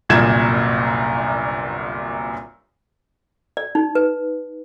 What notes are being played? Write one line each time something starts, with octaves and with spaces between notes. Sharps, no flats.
G1 C2 F#2 A#2 G#6 E7
D5
D#4
B4